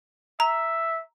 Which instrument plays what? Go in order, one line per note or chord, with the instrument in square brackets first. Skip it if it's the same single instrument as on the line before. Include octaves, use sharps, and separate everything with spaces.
[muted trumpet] E5 [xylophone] A#5